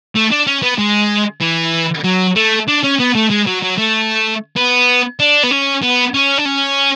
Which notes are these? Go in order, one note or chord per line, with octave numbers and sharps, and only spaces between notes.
A3
D4
C#4
B3
G#3
E3
F#3
A3
D4
C#4
B3
A3
G#3
F#3
F#3
A3
B3
D4
B3
C#4
B3
C#4
D4
C#4